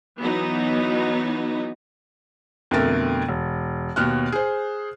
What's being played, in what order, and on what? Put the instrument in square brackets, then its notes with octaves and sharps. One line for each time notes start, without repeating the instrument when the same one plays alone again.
[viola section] E3 F#3 B3 D#4
[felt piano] F2 B2 D3 A3 A#4 A6
E1
D#2 B2 F6 F#6
G#4 C5